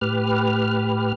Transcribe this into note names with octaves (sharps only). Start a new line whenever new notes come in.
A2 G4 B4 F6